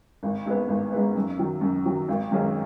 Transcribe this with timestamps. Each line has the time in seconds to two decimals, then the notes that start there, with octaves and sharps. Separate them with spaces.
0.23 G#1
0.46 G#2 G#3 B3
0.68 G#1
0.92 G#2 G#3 B3
1.16 F#2
1.39 D#3 F#3
1.61 F#2
1.86 D#3 F#3
2.08 G#1
2.31 F#2 D#3 G#3 C#4